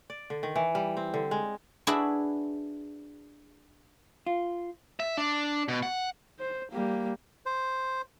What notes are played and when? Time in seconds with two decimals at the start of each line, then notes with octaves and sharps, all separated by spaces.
0.10 D5
0.30 D3
0.43 D#3
0.56 E3
0.75 G3
0.97 C4
1.14 D3
1.31 G#3
1.87 D4 E4 F#4 G#4 B4 E5
4.26 F4
5.00 E5
5.18 D4
5.68 B2
5.83 F#5
6.40 C5
6.72 G3 A#3
7.46 C5